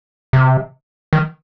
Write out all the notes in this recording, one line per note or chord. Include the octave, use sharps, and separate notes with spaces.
C3
D#3